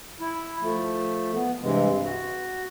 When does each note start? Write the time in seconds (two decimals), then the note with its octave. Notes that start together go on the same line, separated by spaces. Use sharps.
0.20 E4
0.61 F3 A3
1.34 B3
1.62 G2 C3 E3 G#3
2.04 F#4